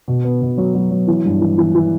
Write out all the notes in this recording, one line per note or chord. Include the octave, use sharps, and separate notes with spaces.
B2
B3
B2
F#3
F#3
F#3
E3
G2
E3
E3
E3